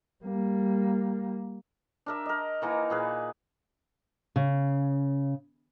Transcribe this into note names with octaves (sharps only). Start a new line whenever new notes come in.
G3 A#3
D4 A#4 E5
A#4 D#5
D#3 E3 A#3
A#2 G#4 B4
C#3